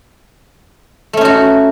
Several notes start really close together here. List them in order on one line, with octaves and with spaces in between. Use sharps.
A3 C#4 D#4 F#4